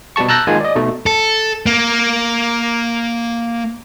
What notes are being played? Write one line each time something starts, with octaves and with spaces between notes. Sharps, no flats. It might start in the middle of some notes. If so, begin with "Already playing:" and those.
B2 G3 G4 A5 C#6
A5 A#5 E6 F#6 G6 A#6
D#3 G#3 A#3 F4 G#5
D5 D#5
B2 A3 D#4
A4
A#3